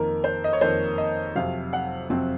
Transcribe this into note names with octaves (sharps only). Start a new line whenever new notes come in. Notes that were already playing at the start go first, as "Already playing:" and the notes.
Already playing: F2 D#3 A#3 A#4
C5
D#5
C#5
F2 D#3 A#3 C5
D#5
F2 C3 F#3 C4 F5
F#5
F2 C3 F#3 C4